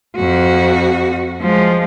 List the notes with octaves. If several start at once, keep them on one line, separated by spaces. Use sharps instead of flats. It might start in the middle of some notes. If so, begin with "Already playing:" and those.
F2 F#4
F3 G#3